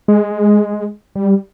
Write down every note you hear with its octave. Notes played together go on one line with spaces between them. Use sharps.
G#3
G3